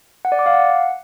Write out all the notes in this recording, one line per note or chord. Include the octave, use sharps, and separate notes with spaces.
F#5
D5
D6
F5
F#5